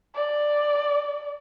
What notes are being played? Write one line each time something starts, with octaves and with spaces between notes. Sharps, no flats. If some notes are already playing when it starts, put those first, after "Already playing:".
D5